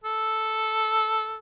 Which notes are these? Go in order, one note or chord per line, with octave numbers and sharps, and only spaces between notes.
A4